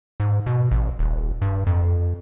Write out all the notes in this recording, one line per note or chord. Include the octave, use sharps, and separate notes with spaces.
G#2
B2
A1
D#1
G2
F2